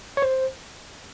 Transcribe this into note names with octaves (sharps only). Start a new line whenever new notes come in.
C#5
C5